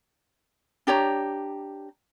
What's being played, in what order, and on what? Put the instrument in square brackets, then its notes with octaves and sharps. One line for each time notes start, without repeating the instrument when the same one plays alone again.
[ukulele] D4 G4 C#5 A#5